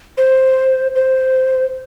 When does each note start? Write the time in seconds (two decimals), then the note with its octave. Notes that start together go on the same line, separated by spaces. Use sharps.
0.18 C5
0.96 C5